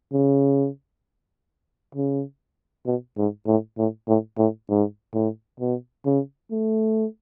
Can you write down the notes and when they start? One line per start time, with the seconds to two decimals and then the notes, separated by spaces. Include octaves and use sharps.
0.13 C#3
1.95 C#3
2.86 B2
3.18 G#2
3.47 A2
3.78 A2
4.08 A2
4.38 A2
4.69 G#2
5.14 A2
5.60 B2
6.05 C#3
6.51 A3